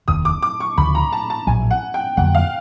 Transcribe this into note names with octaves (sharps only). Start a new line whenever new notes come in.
F1 D#2 D#3 D#6
D6
D6
C#6
D2 C#3 F3 B5
A#5
A5
A5
A#1 A2 F#3 G#5
F#5
G5
F2 D3 F#3 A#3 F#5
F5